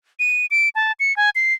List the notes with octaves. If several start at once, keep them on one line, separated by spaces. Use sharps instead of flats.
D#7
D7
A5
C#7
G#5
C7